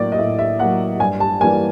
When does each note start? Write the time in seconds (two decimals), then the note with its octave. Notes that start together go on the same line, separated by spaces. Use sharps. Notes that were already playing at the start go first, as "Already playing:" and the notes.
Already playing: A2 F#3 A#3 D5
0.12 D#5
0.19 A2 E5
0.39 E5
0.59 A#3 F#5
0.63 F#3
1.00 G2 G#5
1.20 A5
1.40 E3 G3 A#3 G#5